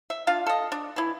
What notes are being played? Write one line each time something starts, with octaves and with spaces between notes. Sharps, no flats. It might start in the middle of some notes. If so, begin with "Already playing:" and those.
E5
D4 F4 F5
A4 D#5
D4
E3 E4